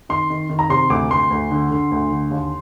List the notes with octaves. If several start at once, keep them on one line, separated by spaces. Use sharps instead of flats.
D#3 C6
D#3
D#3
A#5
C3 C6
D2 D6
D2 C6
D2
D3
D3
D2
D3
D#2